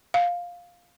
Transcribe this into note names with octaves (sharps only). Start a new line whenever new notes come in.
F5